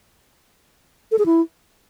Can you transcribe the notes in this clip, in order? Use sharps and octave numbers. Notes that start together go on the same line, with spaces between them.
A4
G#4
E4